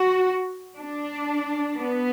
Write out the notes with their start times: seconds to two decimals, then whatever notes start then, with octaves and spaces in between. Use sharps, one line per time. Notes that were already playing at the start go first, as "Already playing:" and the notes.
Already playing: F#4
0.76 D4
1.75 B3